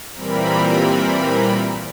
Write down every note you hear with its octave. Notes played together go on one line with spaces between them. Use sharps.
A#2 E3 G3 C4 A#4 B5